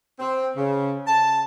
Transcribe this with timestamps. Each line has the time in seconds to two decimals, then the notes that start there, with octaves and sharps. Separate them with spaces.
0.19 C4
0.57 C#3
1.06 A5